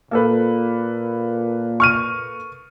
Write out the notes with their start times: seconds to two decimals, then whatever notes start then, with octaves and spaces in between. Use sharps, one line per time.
0.11 A#2 A#3 A4 B4
1.80 C#6 F6 D#7